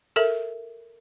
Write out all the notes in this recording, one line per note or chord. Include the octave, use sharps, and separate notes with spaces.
A4 A#4 E5